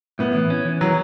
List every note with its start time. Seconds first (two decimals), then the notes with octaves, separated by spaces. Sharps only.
0.19 A2 B3
0.35 E3
0.50 C#4
0.65 E3
0.81 E3 F#3